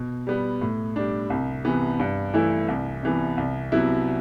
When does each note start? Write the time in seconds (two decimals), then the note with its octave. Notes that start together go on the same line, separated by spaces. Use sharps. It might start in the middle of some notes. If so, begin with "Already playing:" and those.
Already playing: B2
0.27 G3 B3
0.61 A2
0.96 G3 D4
1.30 C2
1.65 C3 E3 B3
2.00 G2
2.34 E3 A3 E4
2.68 C2
3.03 C3 E3 B3
3.38 C2
3.72 C3 F#3 B3 E4